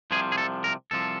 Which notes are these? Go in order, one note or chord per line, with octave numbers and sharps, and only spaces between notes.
C2 C3 F3 G#4
G#4
A4
A#4
C2 C3 F3 A4